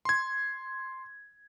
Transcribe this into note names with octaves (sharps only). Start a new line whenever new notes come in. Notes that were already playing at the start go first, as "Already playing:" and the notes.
C6 G#6